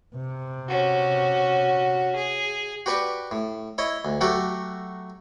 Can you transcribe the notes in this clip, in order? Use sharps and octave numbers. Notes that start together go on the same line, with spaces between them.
C3
C#4 F#4
G#4
F#4 G4 B4 D5 C#6 D6
A2
E4 C#5 D#5
D2
F#3 A3 F#4 G4 A4